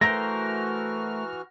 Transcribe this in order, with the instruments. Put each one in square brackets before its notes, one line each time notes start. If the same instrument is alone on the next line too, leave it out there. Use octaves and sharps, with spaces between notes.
[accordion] E3 F#4 F6 [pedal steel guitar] A3 A#4 C5 [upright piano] A#6